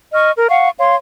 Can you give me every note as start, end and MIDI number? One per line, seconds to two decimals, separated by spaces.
0.14 0.31 75
0.14 0.31 85
0.14 0.31 89
0.36 0.47 70
0.50 0.69 77
0.50 0.69 78
0.50 0.69 85
0.78 0.95 73
0.78 0.95 77
0.78 0.95 84